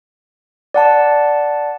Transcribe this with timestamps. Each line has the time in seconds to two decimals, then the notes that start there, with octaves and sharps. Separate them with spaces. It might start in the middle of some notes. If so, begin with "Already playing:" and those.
0.74 D5 F#5 A5